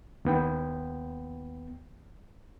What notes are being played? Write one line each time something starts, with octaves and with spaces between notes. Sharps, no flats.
D#2 B3 G5